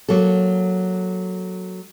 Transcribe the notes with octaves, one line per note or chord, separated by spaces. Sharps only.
F#3 A#3 A4